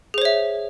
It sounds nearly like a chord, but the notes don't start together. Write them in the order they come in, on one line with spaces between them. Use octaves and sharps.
G#4 C5 C#5 E5